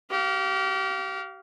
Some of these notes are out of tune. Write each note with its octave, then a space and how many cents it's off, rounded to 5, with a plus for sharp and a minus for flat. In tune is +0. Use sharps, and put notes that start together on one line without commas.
G4 -35 F5 +0